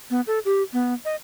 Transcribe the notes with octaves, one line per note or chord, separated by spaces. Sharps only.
B3
A4
G4
B3
D#5